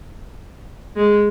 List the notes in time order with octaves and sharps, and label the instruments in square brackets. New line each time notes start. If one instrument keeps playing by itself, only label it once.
[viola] G#3